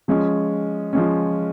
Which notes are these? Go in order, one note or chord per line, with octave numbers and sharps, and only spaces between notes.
F3 G#3 C#4
F3 G#3 C#4